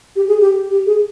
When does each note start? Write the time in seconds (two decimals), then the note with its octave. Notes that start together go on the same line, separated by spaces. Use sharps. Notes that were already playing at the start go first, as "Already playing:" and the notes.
0.16 G4
0.28 G#4
0.41 G4
0.71 G4
0.86 G#4